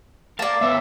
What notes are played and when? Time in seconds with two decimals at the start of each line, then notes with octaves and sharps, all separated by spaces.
0.39 A#4 D5 F5 A5
0.61 A#3 B3 C#5 E5